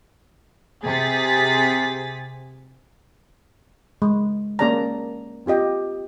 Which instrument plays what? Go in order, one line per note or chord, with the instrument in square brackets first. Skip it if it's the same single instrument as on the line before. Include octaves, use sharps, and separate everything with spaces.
[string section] C3 G#4 A6 B6
[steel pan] G#3
A#3 C#4 G#4 D5 A5 A#5
C4 F4 G4 D#5 G5